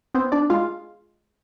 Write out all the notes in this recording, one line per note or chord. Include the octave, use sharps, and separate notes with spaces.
B3 C4 C5
D4 D5
G#3 F4 F5